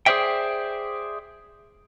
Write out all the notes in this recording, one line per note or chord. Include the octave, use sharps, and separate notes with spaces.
G#4 B4 C5 D5 E5 G5